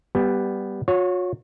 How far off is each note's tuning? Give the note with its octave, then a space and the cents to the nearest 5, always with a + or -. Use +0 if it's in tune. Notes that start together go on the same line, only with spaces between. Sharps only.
G3 +0 B3 +0 G5 +45
F#4 -45 C#5 +0